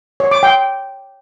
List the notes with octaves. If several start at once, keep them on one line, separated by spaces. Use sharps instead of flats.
C#5
D6
G5